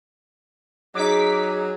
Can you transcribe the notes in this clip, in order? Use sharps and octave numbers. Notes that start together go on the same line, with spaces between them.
F#3 D#4 G#4 D6 B6